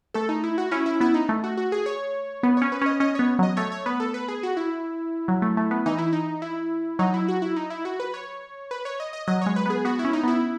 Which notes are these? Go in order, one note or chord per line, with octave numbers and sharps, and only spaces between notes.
A3 A4
D#4
E4
F#4
C#4 E4
E4
B3 E4
D#4
A3
F#4
F#4
G#4
C#5
B3
C#4 C#5
B4
C#4 D#5
C#4 D#5
B3 C#5
F#3 D#5
A3 C#5
C#5
B3 B4
A4
B4
G#4
F#4
E4
F#3
A3
A3
B3
E3 D#4
E4
D#4
E4
F#3 D#4
E4
F#4
E4
D#4
E4
F#4
B4
C#5
B4
C#5
D#5
D#5
F#3 D#5
G#3 C#5
B4
B3 G#4
B3 F#4
E4
C#4
D#4
B3 E4